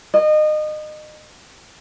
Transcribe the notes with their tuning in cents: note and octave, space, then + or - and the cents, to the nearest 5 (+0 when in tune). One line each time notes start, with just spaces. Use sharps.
D#5 -30